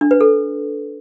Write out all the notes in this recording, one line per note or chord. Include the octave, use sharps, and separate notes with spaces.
D4
B4
A4